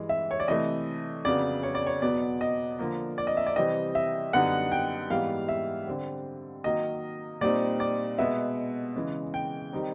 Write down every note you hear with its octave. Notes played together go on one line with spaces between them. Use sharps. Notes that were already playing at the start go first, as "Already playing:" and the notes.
Already playing: G2 E3 G#3
E5
C#5
D5
C3 E3 A3 D#5
F2 C#3 F#3 B3 D5
C#5
D5
C#5
E2 B2 F#3 B3 D5
D#5
D3 F3 A#3
D5
D#5
E5
D5
C3 E3 G3 C4 D#5
E5
F#2 D3 G3 B3 D#4 F#5
G5
G#2 E3 G3 B3 F5
E5
D3 G3 C4
D#3 F#3 A#3 D#5
A#2 G3 C4 D#4 D5
D5
B2 G#3 B3 E5
C#3 E3 G#3 C#4
G5
D#3 G3 C4 D#4